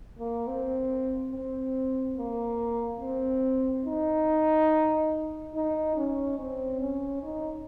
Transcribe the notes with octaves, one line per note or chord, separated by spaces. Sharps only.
A#3
C4
C4
A#3
C4
D#4
D#4
C#4
C4
C#4
D#4